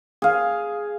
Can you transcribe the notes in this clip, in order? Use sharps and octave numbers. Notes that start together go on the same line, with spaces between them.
G#4 F5